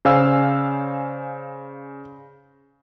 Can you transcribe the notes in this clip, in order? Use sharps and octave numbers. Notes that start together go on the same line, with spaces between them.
C#3 C5 D5 F5 G#5 E6